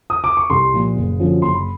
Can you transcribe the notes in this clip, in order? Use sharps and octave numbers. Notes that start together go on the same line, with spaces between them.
D#6
D6
C#6
C2 C6
A#2 F3
F#1
F#2 D3 F3
F#1 C6
B5